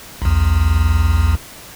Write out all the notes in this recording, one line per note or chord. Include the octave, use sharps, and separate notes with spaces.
B1 E2